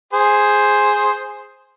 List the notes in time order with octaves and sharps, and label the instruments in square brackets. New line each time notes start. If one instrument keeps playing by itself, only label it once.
[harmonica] G#4 C5